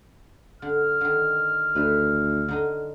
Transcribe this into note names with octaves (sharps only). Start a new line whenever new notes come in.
D3 F6
D3 D#3
D2 A4 B4
D3 D#4 D#5